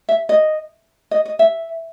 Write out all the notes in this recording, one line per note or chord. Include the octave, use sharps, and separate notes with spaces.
E5
D#5
D#5
D#5
E5